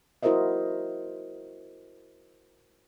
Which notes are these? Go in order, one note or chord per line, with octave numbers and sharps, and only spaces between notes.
E4 F#4 A#4 C5 D#5 E5